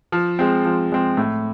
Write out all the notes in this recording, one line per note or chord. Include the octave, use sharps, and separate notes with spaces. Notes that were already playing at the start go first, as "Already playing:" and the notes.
F3
G#3 C4
F3
G#3 C4
A2